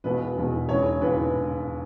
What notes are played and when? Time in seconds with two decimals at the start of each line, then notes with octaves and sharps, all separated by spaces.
0.04 E1 E2 B2 B4
0.37 E1 E2 B2
0.69 E1 D#2 C#3 E3 C#5
1.01 E1 D#2 C#3 E3 B4